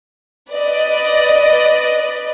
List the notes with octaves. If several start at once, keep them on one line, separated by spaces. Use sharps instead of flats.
B4 D5 D#5